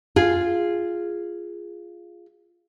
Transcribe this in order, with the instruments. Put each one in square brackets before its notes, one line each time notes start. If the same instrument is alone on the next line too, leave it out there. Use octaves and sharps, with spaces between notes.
[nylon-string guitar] F4 G#4